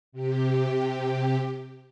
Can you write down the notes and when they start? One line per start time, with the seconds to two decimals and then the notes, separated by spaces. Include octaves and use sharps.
0.12 C3 G4